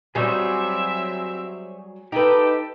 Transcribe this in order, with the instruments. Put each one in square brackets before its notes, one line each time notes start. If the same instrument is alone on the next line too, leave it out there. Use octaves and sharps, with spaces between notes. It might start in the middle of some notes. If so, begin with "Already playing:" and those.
[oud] F#3 G3 [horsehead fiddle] C4 E5 [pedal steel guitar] G#4 C5 C#5
[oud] D#4 B4 [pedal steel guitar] G4 [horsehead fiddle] A4 G5